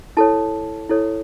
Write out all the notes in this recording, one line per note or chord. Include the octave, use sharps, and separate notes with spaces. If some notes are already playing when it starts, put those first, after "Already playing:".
E4 A4 C#5 A5
E4 A4 C#5